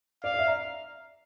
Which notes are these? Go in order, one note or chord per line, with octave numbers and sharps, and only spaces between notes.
D5 F5
D5
E5
A#5